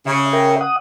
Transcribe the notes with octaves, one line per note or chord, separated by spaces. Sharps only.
C#3 E5
A#4 E5 G5
F#5 D#6